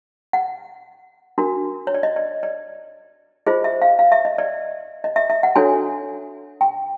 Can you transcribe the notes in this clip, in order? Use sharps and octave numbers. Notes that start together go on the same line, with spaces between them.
F#5
D4 F#4 A#4
C#5
D5
D#5
D5
D5
F4 G#4 C5 D#5
E5
F5
F5
E5
D#5
D5
D#5
E5
E5
F#5
D4 F#4 A4 C#5 G#5
G5